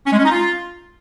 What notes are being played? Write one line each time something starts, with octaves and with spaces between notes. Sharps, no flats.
C#4
G#3
C#4
D#4
F4